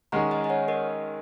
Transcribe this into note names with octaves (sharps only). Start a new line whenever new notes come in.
D#3 G#3 C#4 G#4 F#5 A#5
D#5 G#5
D#5
C#5 F#5
A#4 D#5